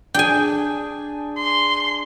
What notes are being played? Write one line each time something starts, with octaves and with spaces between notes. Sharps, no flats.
D4 G#4 G5 G#5
C6